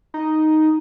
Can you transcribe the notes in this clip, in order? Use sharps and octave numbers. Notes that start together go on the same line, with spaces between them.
D#4